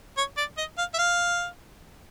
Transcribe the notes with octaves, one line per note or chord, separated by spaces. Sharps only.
C#5
D5
D#5
F5
E5
F5